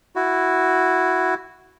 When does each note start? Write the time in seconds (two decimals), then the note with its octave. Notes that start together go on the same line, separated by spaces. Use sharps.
0.16 E4 F#4